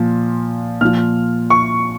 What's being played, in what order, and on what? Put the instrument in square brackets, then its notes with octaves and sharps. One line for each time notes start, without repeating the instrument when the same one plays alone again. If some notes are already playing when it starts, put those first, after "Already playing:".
Already playing: [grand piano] A#2 F3
A#2 F3 F6
C#6